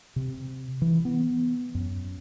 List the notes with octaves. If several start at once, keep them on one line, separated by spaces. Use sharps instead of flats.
C3
E3
B3
F#2